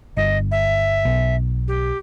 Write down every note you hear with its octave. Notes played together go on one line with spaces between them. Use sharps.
G1 D#5
E5
B1
G4